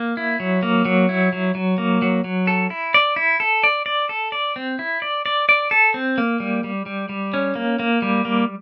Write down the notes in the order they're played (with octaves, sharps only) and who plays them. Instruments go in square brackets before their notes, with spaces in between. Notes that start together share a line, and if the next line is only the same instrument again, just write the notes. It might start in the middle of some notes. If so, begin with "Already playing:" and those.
Already playing: [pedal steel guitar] A#3
E4
F#3
A#3
F#3
E4
F#3
F#3
A#3
F#3
F#3
A4
E4
D5
E4
A4
D5
D5
A4
D5
C4
E4
D5
D5
D5
A4
C4
A#3
G3
G3
G3
G3
C#4
A#3
A#3
G3
A#3